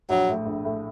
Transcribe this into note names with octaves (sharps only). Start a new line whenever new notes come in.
A#1 F#3
A2 A3
A#1
A2 A3